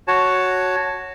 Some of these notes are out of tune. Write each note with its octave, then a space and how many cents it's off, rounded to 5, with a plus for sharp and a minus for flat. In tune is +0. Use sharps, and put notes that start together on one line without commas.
F#4 +0 C#5 +0 A5 +0